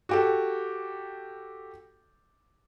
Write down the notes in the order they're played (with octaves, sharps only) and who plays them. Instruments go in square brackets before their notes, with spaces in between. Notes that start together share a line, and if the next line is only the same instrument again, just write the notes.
[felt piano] F#4 G4 A4